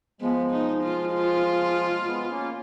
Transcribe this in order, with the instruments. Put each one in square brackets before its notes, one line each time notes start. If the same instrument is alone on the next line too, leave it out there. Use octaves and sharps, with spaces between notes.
[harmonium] F3 G#3 [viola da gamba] B3
[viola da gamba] D#4
F4
F4
[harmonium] G#3 B3
A#3 C#4